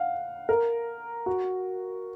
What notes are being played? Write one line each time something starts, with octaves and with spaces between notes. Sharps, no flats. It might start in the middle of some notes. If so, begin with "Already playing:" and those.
Already playing: F5 F#5
A#4
F#4